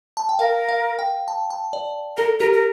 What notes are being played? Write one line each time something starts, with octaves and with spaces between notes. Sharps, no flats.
A5
G5
A#4 F5
F5
G5
A5
A5
D5
A4 A#4
G4 A#4
A#4